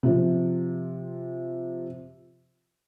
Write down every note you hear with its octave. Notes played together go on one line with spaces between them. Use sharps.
C3 F3